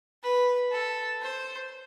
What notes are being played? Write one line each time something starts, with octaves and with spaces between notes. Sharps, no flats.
B4
A4
C5